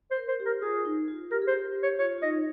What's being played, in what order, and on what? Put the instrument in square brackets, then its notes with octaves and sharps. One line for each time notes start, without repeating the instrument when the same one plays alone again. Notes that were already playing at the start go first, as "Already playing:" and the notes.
[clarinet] C5
[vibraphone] A#4
[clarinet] C5
[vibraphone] G4
[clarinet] A#4
[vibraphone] F4 [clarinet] G#4
[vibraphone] D#4
F4
[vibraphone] G4 [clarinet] A#4
[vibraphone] G#4
[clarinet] C5
[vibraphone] G4
[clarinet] C#5
[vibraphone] F4 [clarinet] C#5
[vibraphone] F4
[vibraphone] D#4 [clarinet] D#5